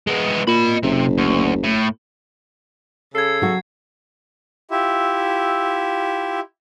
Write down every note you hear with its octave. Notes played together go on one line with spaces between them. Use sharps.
G#3 B3
A#2 D#5 B5
F#1 C3
D2
A2
C#3 A4 G#6 C7
F#3 F#4
E4 F4 G4 E5